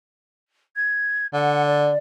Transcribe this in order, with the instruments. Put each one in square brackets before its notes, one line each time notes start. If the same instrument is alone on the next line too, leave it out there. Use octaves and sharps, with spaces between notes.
[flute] G#6
[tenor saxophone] D3 [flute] F#5
[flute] D5